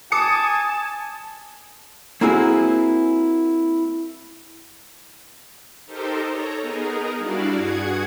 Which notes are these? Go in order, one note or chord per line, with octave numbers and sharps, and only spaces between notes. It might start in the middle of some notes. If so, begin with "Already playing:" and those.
G#5 A5 D6 D#6 C#7
A#3 C4 E4 F#4 G#4
D#4 G4 A4 A#4 C5
A4 C#5 A#5
B3 D#4 G#4 A#4
G3 D4 E4 F#4 D5 F5
G2 F#4 G#4 F#5 G#6